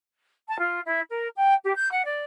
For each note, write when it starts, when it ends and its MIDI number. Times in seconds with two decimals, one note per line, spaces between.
0.47 0.57 81
0.59 0.81 65
0.85 1.00 64
1.10 1.28 70
1.36 1.55 79
1.63 1.73 67
1.76 1.89 91
1.91 2.03 78
2.05 2.23 74